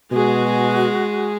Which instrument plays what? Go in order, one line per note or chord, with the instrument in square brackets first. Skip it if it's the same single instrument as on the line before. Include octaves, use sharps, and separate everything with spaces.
[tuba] B2 [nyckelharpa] G#3 G#4 [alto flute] F#4